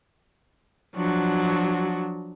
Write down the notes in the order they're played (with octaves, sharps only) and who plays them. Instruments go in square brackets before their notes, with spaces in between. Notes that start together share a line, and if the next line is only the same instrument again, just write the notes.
[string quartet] F3 F#3 D4 F#4